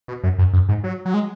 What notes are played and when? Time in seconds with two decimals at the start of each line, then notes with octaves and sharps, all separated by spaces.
0.08 B2
0.23 F#2
0.38 F#2
0.53 F#2
0.69 G#2
0.84 F#3
1.05 F#3
1.14 G#3